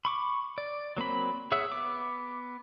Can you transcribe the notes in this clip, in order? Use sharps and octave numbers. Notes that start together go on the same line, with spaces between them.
B5 C#6 D6
D5
F#3 A#3 C4 B5
G#4 C#5 E5 F#5 E6
B3 D6